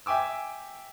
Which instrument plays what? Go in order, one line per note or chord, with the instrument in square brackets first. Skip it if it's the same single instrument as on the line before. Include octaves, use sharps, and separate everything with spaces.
[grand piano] E5 G5 G#5 D6 E6